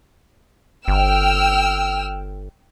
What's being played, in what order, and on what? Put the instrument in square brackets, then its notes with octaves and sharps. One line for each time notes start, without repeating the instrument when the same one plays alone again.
[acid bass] G1 [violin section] G5 E6 F6